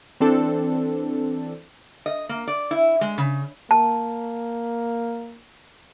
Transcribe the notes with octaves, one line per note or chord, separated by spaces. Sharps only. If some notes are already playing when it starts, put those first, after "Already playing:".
E3 C4 D4 A4
D#5
A#3
D5
E4
G#3
C#3
A#3 A5